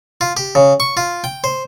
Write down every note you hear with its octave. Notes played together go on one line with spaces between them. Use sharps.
F4
G4
C#3
C#6
F4
G5
C5